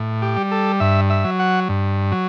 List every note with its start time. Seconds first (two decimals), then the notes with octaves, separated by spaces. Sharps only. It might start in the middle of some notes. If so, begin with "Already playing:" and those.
Already playing: A2
0.22 G4
0.36 G3
0.51 A4
0.80 G2 E5
1.10 E5
1.24 F#3
1.39 F#5
1.69 G2
2.12 F#3